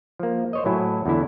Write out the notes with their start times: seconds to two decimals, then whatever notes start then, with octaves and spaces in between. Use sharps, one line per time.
0.20 F3 A#3
0.53 C5 C#5 D#5
0.65 A2 F#3 E4 G#5
1.06 E2 D3 E4